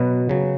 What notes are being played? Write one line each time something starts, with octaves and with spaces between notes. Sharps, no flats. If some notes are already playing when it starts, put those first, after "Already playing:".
Already playing: B2 F#3 B3 B4
C#3 F#3